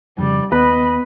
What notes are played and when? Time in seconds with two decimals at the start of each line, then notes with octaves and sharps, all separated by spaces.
0.18 F2 C#3 G3 D5
0.52 D#2 B3 B4 D#5 B5